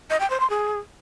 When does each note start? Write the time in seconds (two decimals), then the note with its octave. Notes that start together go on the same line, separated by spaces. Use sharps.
0.10 D#5
0.20 G5
0.30 C5
0.40 C6
0.50 G#4